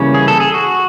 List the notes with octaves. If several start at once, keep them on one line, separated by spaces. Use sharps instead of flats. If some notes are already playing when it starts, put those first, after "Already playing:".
Already playing: C#3 E3 G3 A#3 C#4
G#4
A4
G#4
F#4